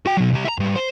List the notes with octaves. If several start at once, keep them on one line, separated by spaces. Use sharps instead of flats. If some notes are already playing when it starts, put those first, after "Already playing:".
F#4 G5
B2 F#3
C2 G4
E4 A#5
G#2 G3
C5